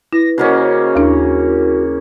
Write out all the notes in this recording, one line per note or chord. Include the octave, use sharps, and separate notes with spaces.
E4 B4 A#6
C#3 A#3 C#4 F#4 C5 D#5 F#5
D#2 D4 E4 A#4